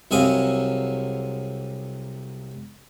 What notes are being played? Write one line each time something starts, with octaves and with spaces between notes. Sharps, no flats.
C2 C3 F#3 G#4 D#5 F5